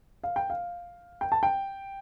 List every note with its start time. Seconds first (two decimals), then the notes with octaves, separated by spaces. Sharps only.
0.24 F5
0.36 G5
0.50 F5
1.21 G5
1.32 A5
1.43 G5